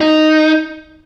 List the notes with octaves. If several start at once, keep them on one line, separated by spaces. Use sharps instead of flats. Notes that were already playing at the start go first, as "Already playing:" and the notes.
D#4